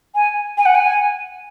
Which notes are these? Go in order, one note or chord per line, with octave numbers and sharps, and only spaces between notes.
G#5
G#5
F#5
G#5